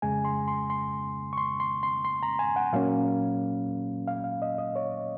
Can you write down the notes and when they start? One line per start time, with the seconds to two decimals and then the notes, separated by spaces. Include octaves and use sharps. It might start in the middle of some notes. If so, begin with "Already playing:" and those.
0.02 F2 C#3 G#3 G#5
0.25 C6
0.48 C6
0.70 C6
1.33 C#6
1.38 C6
1.60 C6
1.83 C6
2.05 C6
2.23 A#5
2.39 G#5
2.56 F#5
2.73 A#2 F#3 A#3 C#4 F5
4.07 F5
4.24 F5
4.42 D#5
4.58 D#5
4.76 C#5